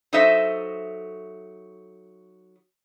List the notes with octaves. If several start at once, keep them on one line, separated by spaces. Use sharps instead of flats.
F#3 D#4 A4 C5 D#5 E5